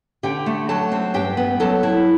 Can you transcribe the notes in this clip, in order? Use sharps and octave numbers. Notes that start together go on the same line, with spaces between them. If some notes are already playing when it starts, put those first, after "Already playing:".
D3 G4 G5
A3
F#3 A4 A5
C4
G2 G4 G5
B3
F#3 A4 A5
E4